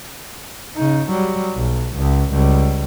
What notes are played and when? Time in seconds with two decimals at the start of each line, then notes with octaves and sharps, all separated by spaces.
0.76 C#3 D#4
1.10 F#3 G3
1.56 B1
1.96 C#2
2.31 C#2 G3